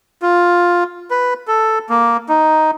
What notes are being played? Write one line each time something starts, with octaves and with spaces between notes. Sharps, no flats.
F4
B4
A4
A#3
D#4